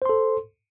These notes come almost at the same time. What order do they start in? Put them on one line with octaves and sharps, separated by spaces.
C5 C6 A4